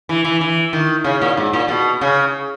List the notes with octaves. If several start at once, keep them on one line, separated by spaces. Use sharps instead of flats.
E3
E3
E3
D#3
C#3
A#2
G#2
A#2
B2
C#3